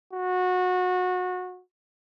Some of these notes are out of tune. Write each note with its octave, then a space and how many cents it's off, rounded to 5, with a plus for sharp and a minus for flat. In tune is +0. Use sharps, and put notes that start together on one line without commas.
F#4 -25